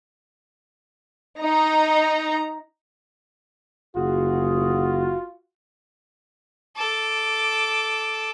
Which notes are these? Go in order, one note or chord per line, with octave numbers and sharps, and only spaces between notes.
D#4 A#5
F#1 F4 F#4 G#4
A4 D6